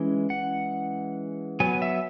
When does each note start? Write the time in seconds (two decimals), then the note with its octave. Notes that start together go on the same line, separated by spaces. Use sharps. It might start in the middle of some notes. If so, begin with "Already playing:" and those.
Already playing: E3 G#3 C#4
0.30 F#5
1.60 F#3 B3 G#5
1.82 E5